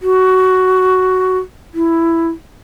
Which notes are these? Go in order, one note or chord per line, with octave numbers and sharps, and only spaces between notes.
F#4
E4